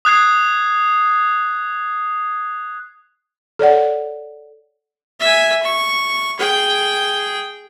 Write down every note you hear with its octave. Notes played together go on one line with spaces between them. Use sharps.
D#6 F#6 G#6 C7
A4 C#5 D5 F#5
E5 G#5
C#6
G#4 G5